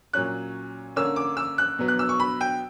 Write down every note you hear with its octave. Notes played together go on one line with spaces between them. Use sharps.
A#2 F#3 C#4 F#6
D3 A#3 C#4 E6
D6
E6
F#6
B2 F#3 B3
F#6
E6
C#6
B5
G5